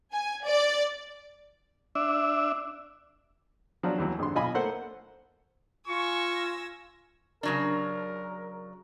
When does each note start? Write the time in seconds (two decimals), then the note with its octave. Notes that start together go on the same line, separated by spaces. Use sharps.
0.12 G#5
0.44 D5
1.95 D4 E5
3.83 F3 F#3 D4
3.98 D#2 E3 F#3
4.19 G#1 D3 C6
4.35 B1 F4 D#5 G#5 B5
4.54 A3 A#3 C5 F#5
5.88 F4 G#5 C#6 E6 A#6
7.43 C#3 F#3 D4 A#4